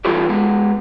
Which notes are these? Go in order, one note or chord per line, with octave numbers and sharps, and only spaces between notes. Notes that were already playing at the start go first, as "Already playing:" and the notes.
E3 G3 F4 A4 B4 D5
G#3 B3